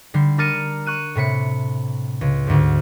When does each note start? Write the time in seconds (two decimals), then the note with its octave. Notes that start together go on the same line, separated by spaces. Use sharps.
0.14 D3 G3 C7
0.38 D4 A#4 F6 A6 C#7 D#7
0.85 C#6 F#6 D#7 E7
1.15 A2 C3 B5 C#7
2.21 C#2
2.47 D2 G#2